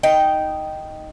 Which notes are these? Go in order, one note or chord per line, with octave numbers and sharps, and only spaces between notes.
D#4 D#5 G5